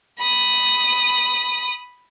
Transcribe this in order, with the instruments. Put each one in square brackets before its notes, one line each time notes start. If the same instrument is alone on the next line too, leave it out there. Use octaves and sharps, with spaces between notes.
[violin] B5 D#6